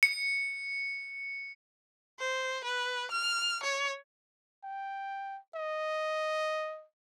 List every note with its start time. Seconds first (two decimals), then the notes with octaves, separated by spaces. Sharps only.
0.03 C#7
2.19 C5
2.64 B4
3.11 F6
3.63 C#5
4.64 G5
5.55 D#5